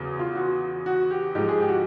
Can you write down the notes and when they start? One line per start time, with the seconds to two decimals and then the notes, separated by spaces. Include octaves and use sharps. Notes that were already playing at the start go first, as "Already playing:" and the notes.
Already playing: E2 C#3 F#3
0.19 F4
0.35 F#4
0.86 F#4
1.11 G4
1.35 G#2 F3 G#3 G4
1.48 G#4
1.60 G4
1.68 F#4